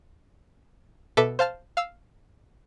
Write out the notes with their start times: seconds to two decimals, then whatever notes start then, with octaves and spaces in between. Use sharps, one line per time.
1.17 B2 A4 B4 E5 D6
1.39 C5 F5 A5 F6
1.77 F5 E6